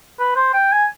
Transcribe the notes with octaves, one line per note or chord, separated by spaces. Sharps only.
B4
C5
G5
G#5